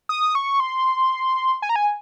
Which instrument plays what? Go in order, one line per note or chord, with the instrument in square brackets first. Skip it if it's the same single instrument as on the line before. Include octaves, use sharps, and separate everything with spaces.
[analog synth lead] D#6
C#6
C6
G#5
A#5
G#5